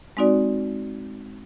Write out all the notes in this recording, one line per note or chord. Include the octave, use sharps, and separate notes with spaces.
G#3 C4 D#4 F#4 D5